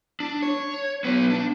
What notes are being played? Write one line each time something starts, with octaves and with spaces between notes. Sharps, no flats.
D4
C#5
F#3 B3
D4